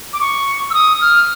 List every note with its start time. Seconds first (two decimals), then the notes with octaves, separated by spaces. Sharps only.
0.13 D6
0.21 C#6
0.70 E6
0.74 D#6
1.01 F6